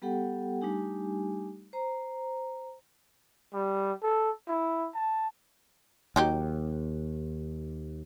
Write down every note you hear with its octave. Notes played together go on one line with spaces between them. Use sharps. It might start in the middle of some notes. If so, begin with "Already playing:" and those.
G3 B3 G4 A4 F#5 G5
G3 A3 D4 D#4 G4 G#5
C5 A#5
G3
A4
E4
A5
D#2 F#3 D#4 G4